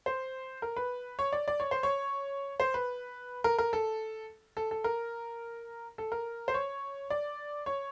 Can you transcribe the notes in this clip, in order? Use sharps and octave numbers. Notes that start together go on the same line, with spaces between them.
C5
A#4
B4
C#5
D5
D5
C#5
C5
C#5
C5
B4
A#4
A#4
A4
A4
A4
A#4
A4
A#4
C5
C#5
D5
C#5